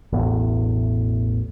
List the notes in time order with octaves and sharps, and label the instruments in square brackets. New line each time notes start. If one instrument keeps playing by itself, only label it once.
[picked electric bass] E1 A1 E2 A2